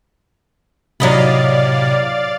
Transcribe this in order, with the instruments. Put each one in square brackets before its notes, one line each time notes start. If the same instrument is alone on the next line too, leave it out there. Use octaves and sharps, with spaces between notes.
[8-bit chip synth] A2 C3 [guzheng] F#3 D#5 B5 [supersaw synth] D5 F5 A6